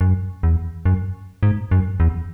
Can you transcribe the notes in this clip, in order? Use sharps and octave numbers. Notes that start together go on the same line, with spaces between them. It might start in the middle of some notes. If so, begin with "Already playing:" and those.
F#2
E2
F#2
G#2
F#2
E2